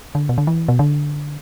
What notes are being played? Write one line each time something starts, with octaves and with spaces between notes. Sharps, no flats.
D3
B2
D3
E3
B2
D3